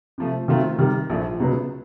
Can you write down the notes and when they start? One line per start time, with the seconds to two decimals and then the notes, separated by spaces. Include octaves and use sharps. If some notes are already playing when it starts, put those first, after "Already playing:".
0.18 C3 F3 A3
0.48 D#3 F#3 A3 C4 F4
0.79 C3 D#3 G3
1.09 A#1 A2 F3 A3
1.40 C#2 B2 F#3 B3